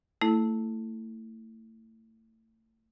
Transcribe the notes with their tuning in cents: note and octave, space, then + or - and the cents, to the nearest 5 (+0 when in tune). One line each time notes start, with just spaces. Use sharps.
A3 +30 E4 +0 A4 -20